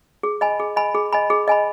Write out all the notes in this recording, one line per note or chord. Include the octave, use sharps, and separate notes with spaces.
G#4
D#5 G#5 B5
G#4
D#5 G#5 B5
G#4
D#5 G#5 B5
G#4
D#5 G#5 B5